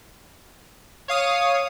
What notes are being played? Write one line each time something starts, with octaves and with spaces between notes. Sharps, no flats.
C#5 F5 D#6